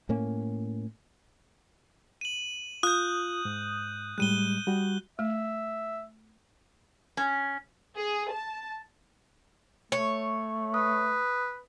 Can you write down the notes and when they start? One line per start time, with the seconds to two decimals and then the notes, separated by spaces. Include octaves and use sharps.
0.09 A2 A#3 C#4
2.21 D#7 F#7
2.83 F4 D#6 F#6 G6
3.45 G#2
4.18 A2 G3 G#3 F#6 D#7 G7
4.67 G3 F#4
5.19 A3 E5
7.17 C#4
7.98 G#4
8.33 A5
9.92 A3 C#5
10.74 B4 D#6